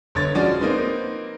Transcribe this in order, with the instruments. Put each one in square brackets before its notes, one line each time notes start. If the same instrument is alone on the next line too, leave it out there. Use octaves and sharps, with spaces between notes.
[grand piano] G1 D3 C#5 A6
F3 G#3 C#4 F#4 D5
A#3 C4 D#4 B4